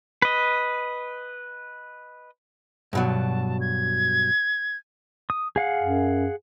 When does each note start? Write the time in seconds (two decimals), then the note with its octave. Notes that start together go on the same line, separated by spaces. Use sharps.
0.22 B4 D#5
2.93 G2 B2 F#3 A5
3.61 G#6
5.30 D#6
5.56 G#4 F5 F#5
5.83 F#2